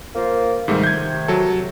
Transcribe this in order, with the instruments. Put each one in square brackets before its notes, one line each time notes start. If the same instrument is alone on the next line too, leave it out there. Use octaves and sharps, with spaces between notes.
[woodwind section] A#3 F4 C5
[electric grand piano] G#2 G3 A3 [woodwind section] C3 D#3
[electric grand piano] G6 G#6
F#3 A4